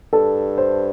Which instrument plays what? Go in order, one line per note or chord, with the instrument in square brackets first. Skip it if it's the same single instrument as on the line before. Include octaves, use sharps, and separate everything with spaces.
[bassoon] G2 [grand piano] A4
[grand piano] C5